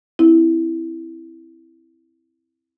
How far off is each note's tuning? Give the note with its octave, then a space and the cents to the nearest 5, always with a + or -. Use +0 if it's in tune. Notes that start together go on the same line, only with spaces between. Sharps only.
C4 +0 E4 +0